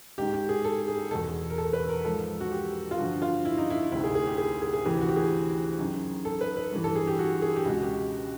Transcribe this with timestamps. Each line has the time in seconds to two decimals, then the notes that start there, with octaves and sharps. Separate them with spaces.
0.18 G#2 D#3 G4
0.34 G4
0.49 G#4
0.65 A4
0.88 G#4
1.11 E2 B2 A4
1.50 A#4
1.58 A4
1.73 B4
1.89 A#4
2.05 G#2 F3 A4
2.41 F#4
2.52 G4
2.91 F4
2.98 G2 D3 F3 F#4
3.22 F4
3.45 E4
3.58 D#4
3.70 E4
3.92 D2 C3 D#3 E4
4.04 G#4
4.15 G#4
4.27 G4
4.38 G#4
4.62 G#4
4.73 G#4
4.85 D2 C3 E3 G4
5.01 F#4
5.09 G4
5.16 G#4
5.79 F#2 D#3
6.25 A4
6.41 B4
6.57 B4
6.72 G2 E3
6.84 A4
6.96 G#4
7.07 G4
7.19 F#4
7.42 G#4
7.56 G4
7.65 C#2 B2 F#4
7.83 G4